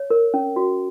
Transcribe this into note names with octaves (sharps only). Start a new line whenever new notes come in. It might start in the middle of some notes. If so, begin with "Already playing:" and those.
Already playing: C#5
A#4
C#4
F#4